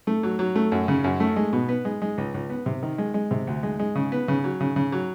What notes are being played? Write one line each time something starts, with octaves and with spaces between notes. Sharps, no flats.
A3
F#3
F#3
A3
F#2
C#3
F#2
A3
G#3
B2
B3
G#3
G#3
C#2
C#2
B3
C3
D#3
G#3
G#3
C3
D2
G#3
G#3
C#3
B3
C#3
F#3
C#3
C#3
F#3